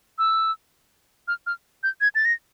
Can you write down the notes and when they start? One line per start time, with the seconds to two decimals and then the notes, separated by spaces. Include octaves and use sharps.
0.19 E6
1.28 F6
1.47 F6
1.83 G6
2.01 G#6
2.15 A6
2.25 A#6